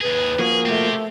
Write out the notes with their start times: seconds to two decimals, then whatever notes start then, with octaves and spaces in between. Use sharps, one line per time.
0.01 D#2 G#4 B4
0.39 F3 A#3 F#4 G#4
0.65 A3 C4 G4